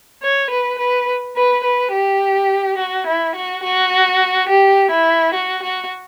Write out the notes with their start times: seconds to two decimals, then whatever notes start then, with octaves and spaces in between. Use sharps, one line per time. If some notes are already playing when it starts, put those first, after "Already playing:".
0.23 C#5
0.50 B4
0.79 B4
1.36 B4
1.64 B4
1.92 G4
2.78 F#4
3.07 E4
3.35 F#4
3.63 F#4
4.49 G4
4.91 E4
5.34 F#4
5.62 F#4